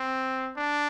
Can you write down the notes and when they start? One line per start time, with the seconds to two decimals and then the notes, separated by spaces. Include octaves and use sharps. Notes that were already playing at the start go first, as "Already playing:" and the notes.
Already playing: C4
0.57 D4